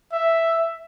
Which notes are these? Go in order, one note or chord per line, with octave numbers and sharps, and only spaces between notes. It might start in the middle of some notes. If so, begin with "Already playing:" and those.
E5